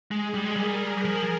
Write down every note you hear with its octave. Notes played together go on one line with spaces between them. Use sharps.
G#3 G#4
G3
G#3
G3 A#4
F3